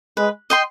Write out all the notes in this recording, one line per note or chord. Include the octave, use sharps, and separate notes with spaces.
G#3 B4
D#5 G5 C6